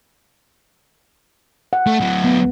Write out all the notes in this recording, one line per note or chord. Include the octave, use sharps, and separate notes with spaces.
F#5
A3
D2 F#3
B3